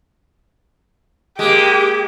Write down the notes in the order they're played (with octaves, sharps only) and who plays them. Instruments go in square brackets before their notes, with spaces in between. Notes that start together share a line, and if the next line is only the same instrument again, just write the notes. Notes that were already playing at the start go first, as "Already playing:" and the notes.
[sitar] G#3 A#3 [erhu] G4